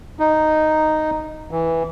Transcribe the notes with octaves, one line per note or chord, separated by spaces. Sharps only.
D#4
E3